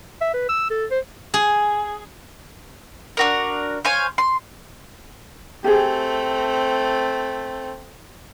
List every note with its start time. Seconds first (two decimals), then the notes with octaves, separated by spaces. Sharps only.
0.21 E5
0.34 B4
0.49 E6
0.71 A4
0.91 C5
1.34 G#4
3.17 D4 F#4 A#4
3.85 C5 C#5 F5 G#5
4.18 C6
5.64 A3 C4 G4 G#4